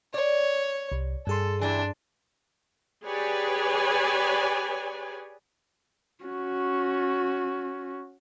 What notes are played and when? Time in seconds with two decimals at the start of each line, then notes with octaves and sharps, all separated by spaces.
0.14 C#5 D5
0.92 C2
1.27 G2 G#4 A4 C6
1.61 E3 G3 D4 E4
3.05 G4 G#4 B4 C#5 D5 G#5
6.24 C#4 F#4